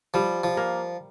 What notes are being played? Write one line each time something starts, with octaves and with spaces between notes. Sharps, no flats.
F3 G3
F3
A#3